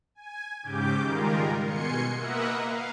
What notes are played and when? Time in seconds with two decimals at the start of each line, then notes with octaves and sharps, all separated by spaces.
0.15 G#5
0.63 G#2 C#3 G4 D6 G6
1.02 D#3 G3 G#3 F4 A#4
1.63 B2 G#5 C6 C#7
2.16 A#3 A#4 B4 D#5 E5 F#5
2.60 F5